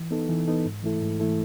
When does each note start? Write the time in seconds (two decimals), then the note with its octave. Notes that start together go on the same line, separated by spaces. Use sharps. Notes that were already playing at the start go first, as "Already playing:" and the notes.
Already playing: E3
0.11 B3 D#4 A4
0.29 E3
0.47 B3 D#4 A4
0.65 G#2
0.83 E3 A3 E4 A4
1.02 G#2
1.20 E3 A3 E4 A4